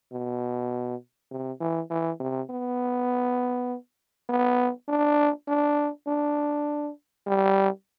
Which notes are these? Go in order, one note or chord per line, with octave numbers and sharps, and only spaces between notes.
B2
C3
E3
E3
C3
B3
B3
D4
D4
D4
G3